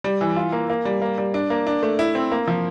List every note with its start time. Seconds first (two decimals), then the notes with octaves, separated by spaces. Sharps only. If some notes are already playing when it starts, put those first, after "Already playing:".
0.04 G3
0.21 E3
0.37 F4
0.52 A#3
0.70 A#3
0.85 G3
1.02 A#3
1.18 G3
1.34 D4
1.50 A#3
1.67 D4
1.83 A3
1.99 E4
2.15 C4
2.31 A#3
2.48 F3